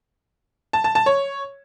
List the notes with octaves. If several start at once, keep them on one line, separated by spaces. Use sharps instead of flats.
A5
A5
A5
C#5